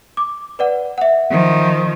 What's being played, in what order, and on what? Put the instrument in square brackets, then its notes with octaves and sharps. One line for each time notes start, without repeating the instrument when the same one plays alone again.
[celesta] D6
B4 D5 F#5
E5 F#5
[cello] D#3 F3